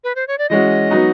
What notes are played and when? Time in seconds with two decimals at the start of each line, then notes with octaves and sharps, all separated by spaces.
0.04 B4
0.15 C5
0.28 C#5
0.38 D5
0.49 E3 G#3 C#4 F#4 D#5
0.90 F#3 B3 D#4 F#4